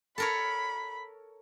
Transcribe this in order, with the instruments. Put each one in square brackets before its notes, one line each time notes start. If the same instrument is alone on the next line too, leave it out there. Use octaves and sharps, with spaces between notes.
[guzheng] A4 A#4 C#5 [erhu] B5